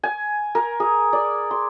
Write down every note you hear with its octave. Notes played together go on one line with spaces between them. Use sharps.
G#5
A#4
G#4
D5
C6